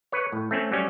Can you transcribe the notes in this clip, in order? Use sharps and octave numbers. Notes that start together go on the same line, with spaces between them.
B4 C#5
A2
A3 C4 C#4
F#3 G3 C#4